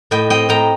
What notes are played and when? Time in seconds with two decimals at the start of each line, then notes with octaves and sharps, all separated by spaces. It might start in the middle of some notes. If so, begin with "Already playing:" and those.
0.11 A2 D#5 G5
0.30 C4 D#5 G5
0.49 A2 G5 A#5